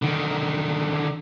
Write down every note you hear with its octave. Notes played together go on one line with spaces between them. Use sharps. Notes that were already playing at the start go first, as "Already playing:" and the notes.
D3 D#3